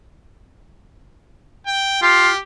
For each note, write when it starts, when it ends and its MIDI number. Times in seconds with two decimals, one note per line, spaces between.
1.67 1.99 79
2.02 2.29 65
2.02 2.41 67